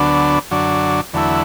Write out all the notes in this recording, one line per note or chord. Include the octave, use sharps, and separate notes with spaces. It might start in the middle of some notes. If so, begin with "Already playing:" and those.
Already playing: D2 D3 F#3 B3 D4
F#2 D3 F#3 D4
E2 D3 F#3 A3 E4